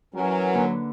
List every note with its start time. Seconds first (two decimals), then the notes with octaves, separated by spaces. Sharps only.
0.14 E3 F#3 C#4 A#4
0.53 D3 A#3 B4